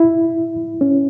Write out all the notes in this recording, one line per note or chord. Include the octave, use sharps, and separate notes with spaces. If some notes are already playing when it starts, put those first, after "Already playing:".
Already playing: E4
C#4